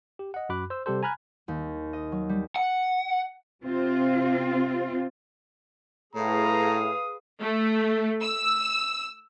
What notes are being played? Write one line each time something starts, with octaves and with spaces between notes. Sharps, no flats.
G4
D#5 F#5
F#2 F#4 B5 D6 F#6
C5 E6
C3 G3 G4 A4 C5
G#5 A#5 B5 F6 F#6 G#6
D#2
D#5
F#3
G3
F#5
C3 C4 F4
A2 G#4 B4 F5 A#5 D#6
A3
E6